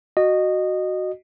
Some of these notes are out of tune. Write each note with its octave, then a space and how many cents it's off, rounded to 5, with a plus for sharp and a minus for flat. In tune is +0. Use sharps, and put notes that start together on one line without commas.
F#4 +0 D#5 -15